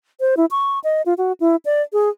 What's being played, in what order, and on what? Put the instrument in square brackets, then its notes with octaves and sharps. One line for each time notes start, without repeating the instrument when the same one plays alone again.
[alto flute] C5
E4
C#6
D#5
F4
F#4
E4
D5
G#4